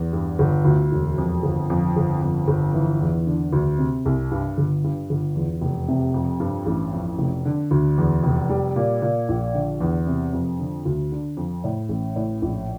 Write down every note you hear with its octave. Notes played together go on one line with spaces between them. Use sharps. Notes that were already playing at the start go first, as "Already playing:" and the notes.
Already playing: E2
G2
G1
D2
E1
F2
G1
F2
G1
F2
G1
E3
E2
D3
D2
C3
C2
G2
G1
G2
G1
E2
F1
C3
F2
G2
A1
F2
F1
D3
D2
E2
F1
G3
A#2
A#2
A#1
D3
E2
C3
F2
D3
D2
D3
F2
A2
A1
A2
A#1